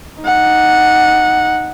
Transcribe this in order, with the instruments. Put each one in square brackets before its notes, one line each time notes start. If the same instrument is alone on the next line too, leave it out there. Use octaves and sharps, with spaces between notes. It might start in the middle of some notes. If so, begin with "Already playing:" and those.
[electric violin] D#4 F#5